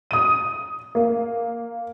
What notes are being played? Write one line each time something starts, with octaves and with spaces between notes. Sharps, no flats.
D#6 D#7
A#3